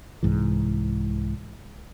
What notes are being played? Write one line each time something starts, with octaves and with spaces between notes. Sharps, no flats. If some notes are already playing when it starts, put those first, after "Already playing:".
C2 G#2 E3